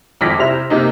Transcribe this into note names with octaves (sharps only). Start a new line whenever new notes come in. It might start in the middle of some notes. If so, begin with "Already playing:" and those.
G#1 F2 D6 F6 A#6 B6
C3 E4 C5 F7
C3 A#3 D#4